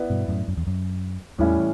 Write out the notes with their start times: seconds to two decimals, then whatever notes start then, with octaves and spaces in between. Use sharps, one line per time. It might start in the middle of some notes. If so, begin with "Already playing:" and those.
Already playing: B3 E4 B4 D5
0.10 G2 B2
0.28 F#2 A2
0.48 F#2
0.57 E2
0.67 F#2
1.38 E2 A2 E3 G3 C#4 E4